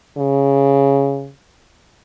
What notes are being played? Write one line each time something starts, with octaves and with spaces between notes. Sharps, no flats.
C#3